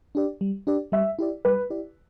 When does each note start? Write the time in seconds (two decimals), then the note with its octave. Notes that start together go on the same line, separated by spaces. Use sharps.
0.15 D4 G4 D5
0.41 G3
0.67 D4 G4 D5
0.92 G3 E5
1.19 E4 G4 D5
1.45 G3 B4
1.70 E4 G4 D5